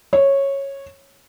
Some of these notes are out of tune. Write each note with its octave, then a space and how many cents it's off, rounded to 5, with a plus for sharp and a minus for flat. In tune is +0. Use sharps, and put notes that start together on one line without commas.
C#5 -10